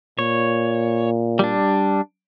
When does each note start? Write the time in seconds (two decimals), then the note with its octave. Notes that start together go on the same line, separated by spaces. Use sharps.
0.19 A#2 C#5
1.39 G3 D4